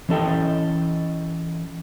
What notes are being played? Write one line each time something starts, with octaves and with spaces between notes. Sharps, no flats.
E3 C#4 D4 A4 D#5 G5